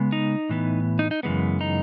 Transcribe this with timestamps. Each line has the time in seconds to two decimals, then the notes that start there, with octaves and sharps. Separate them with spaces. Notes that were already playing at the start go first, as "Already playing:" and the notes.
Already playing: C#3 G#3 B3
0.12 D#4
0.49 A2 E3 B3
0.99 D#4
1.11 D#4
1.23 F#2 C#3 E3 G#3 B3
1.61 D#4